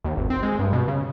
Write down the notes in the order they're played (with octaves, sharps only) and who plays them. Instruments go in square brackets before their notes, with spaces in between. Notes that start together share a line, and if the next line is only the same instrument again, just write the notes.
[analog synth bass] D#2
G#1
C4
G#3
G2
B2
C#3